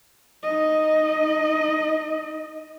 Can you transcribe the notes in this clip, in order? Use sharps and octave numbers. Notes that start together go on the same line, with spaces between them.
D#4 D#5